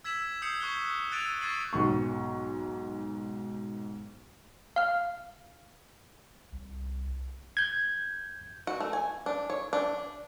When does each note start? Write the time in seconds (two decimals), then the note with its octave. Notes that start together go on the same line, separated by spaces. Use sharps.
0.05 E6 G#6 B6 E7 F#7
0.42 D#6 E6 G6 C7 C#7 F#7
0.60 C#6 F#6 G7
1.11 E6 F#6 A6 D7 D#7 F7
1.41 C#6 G#6 A6 C7 D#7 F#7
1.73 B1 G#2 C#6
4.76 F5 F6
6.52 C2
7.57 G6 G#6
8.67 F#4
8.80 A3
8.93 G#5
9.26 D4
9.50 C#5
9.73 D4